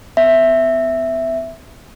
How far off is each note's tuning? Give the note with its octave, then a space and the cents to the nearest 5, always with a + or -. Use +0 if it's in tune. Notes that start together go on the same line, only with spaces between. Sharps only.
B3 +40 E5 +0